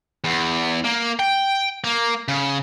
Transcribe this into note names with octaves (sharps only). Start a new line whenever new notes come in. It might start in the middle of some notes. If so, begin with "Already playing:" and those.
E2
A#3
G5
A#3
C#3